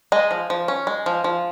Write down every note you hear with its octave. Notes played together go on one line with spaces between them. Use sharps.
G#3 D#5
F3
F3
C#4
G#3
F3
F3